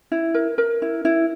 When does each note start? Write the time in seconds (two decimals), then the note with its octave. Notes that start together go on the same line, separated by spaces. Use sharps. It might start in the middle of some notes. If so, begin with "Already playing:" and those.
0.12 E4
0.34 A#4
0.58 A#4
0.82 E4
1.05 E4